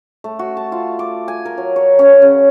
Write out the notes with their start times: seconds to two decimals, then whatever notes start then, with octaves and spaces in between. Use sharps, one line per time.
0.24 A3
0.39 F#4
0.57 A5
0.72 F4
0.99 D6
1.28 G#5
1.45 A#4
1.58 F#3
1.76 C#5
1.99 C#4
2.22 C#3